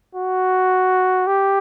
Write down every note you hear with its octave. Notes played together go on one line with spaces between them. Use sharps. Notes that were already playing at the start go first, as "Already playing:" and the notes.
F#4
G4